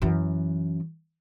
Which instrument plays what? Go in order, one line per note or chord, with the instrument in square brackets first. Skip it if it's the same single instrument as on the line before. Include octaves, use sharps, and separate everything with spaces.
[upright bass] F#2 E3